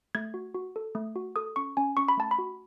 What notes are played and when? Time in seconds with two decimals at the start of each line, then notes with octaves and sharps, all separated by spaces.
0.15 A3 G#6
0.34 F#4
0.55 F#4
0.76 A4
0.95 A3
1.16 F#4
1.36 A4 D#6
1.56 C#4 C#6
1.77 C#4 G#5
1.97 C#4 C#6
2.08 B5
2.17 A3 A5
2.31 B5
2.38 F#4